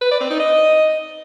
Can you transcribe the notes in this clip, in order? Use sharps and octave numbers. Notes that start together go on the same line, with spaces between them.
B4
D5
C4
D#4
D#5